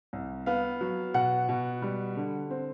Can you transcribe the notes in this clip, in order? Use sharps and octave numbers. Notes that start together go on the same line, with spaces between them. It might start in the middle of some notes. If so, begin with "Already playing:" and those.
C2
B3 F5
F#3
B2 F#5
B2
G3
D3
C4